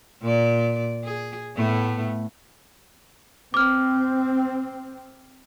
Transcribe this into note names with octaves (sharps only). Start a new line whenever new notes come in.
A#2 D5
G#4
A2 A3 B3
C4 D6 F6